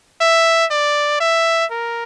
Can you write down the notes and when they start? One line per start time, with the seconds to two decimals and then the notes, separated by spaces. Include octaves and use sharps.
0.21 E5
0.71 D5
1.20 E5
1.71 A#4